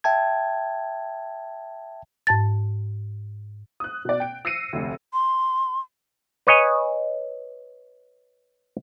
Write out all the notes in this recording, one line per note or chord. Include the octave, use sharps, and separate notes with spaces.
E5 G5 A5 G#6
G#2 A5 A6
D#6 F#6
B2 D5
G5 D7
E6 A#6 C7 C#7 D#7
F1 D2
C6
B4 C#5 D#5 G#5